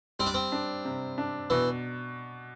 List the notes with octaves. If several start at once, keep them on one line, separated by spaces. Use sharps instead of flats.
G3 C4
D4
C4
D4
C3
D4
B2 E3